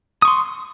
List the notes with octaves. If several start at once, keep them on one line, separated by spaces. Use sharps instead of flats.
C6 C#6 D#6